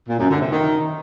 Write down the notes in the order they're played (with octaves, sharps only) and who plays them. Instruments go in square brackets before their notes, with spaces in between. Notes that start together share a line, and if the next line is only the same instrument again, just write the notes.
[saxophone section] A#2
F#2
D3
C3
D#3